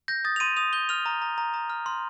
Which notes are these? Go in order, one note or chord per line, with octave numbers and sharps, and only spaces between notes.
G6 A#6
D#6 A6
F7
C6 D#7
D#6 F7
G6 G7
F6 F7
A#5
A#5
A#5
A#5
F6
C6